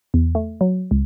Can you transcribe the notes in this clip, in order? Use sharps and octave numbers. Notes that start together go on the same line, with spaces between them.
E2
A3
F#3
C#2